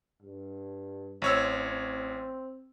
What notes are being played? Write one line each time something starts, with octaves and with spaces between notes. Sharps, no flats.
G2
A1 C4 C#5 E6
C4